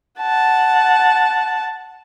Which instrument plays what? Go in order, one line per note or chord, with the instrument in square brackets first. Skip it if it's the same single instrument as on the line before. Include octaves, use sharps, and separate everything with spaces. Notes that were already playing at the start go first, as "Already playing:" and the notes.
[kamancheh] F#5 A5